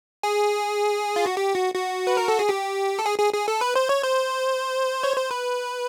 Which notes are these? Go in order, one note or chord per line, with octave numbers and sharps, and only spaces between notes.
G#4
F4
F#4
G4
F#4
F#4
B4
A#4
A4
G#4
G4
A4
G#4
G#4
G#4
A4
B4
C5
C#5
C5
C#5
C5
B4